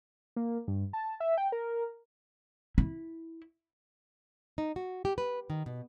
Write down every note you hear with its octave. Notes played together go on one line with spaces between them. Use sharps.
A#3
G2
A5
E5
G5
A#4
E4
D#4
F#4
G4
B4
D#3
B2